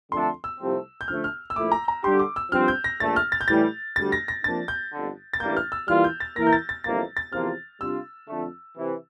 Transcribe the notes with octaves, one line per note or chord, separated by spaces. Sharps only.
F2 D3 A3 D4 A4 C6
E6
C2 C3 F3 A3 C4
G6
D3 F3 A3 F6
F6
E6
A#1 A#2 A3 E4 D6
A#5
A#5
D3 G3 D4 G4 C6
D6
E6
G2 F3 C4 F6
G6
A#6
A#1 A#2 A3 A6
F6
A6
G6
A2 E3 G3 A6
D2 D3 G3 A6
A#6
A#6
C3 F3 A#3 D4 A6
G6
G1 F2 D3
A6
A1 G2 E3 G3 A#3 G6
F6
E6
E3 G3 A#3 F4 F6
G6
A6
E3 A#3 E4 A#4 A#6
G6
A6
A6
G1 F2 E3 A#3 A6
A6
E2 C3 F3 A#3 F4 F6
C3 G3 D4 F4 E6
F2 D3 A3
C3 E3